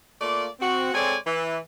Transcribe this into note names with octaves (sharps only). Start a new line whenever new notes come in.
A3 A#3 F4 D5
C4 F#4
G#3 C4 A4 C#5 D5 G#5
E3